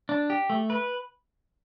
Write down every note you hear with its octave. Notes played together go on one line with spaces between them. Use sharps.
D4
G4
A3
B4